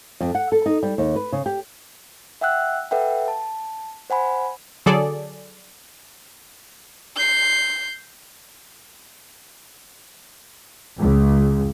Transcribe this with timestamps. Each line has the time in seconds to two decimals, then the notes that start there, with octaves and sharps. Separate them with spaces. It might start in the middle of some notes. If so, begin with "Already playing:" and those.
0.21 F2
0.35 F#5
0.52 A4
0.66 D#4
0.83 G3
0.98 D#2
1.16 B4
1.32 C#3
1.46 G4
2.41 E5 F#5 G5 E6 F#6
2.91 A4 B4 E5 F#5 G5
3.28 A5
4.10 C5 F#5 G#5 B5
4.86 D3 F#3 G#4 A4 D5
7.16 G6 C7
11.00 C#2